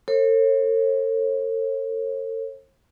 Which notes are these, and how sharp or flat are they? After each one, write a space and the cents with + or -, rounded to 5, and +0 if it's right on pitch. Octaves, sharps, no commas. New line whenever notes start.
A4 +40 C#5 -45